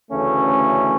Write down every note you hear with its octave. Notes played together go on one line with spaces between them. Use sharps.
D2 C#3 E3 A3 C#4